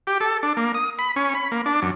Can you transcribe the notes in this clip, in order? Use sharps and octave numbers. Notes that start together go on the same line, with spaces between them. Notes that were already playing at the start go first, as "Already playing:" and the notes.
G4
A4
D4
A#3
D#6
B5
C#4
B5
A#3
D4
F#2